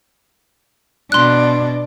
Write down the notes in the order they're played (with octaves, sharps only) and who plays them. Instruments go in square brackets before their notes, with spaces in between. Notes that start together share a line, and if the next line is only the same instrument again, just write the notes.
[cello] B2 D4 [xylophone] C6 F#6